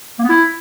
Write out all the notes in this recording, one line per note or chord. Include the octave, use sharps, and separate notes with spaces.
A#3
B3
E4